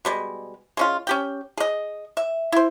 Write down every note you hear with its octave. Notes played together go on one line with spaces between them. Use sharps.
B2 G3 G#3
G#3 C#4 F4
C#4 G4 G5
G#4 D#5
E5
E4 C5